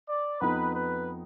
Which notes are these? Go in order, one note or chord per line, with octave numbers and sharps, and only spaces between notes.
D5
F2 F3 B3 D#4 B4
B4